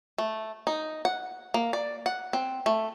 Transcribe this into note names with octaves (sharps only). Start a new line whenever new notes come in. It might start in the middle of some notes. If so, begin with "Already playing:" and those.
A3
D#4
F#5
A#3
D5
F#5
C4
A3